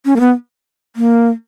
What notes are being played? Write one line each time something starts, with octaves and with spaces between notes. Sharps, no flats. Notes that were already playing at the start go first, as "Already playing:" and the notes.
C#4
A#3
B3
A#3